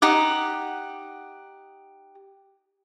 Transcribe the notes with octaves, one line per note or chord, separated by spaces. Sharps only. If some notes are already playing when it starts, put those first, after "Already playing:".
D#4 G4 F#5 D6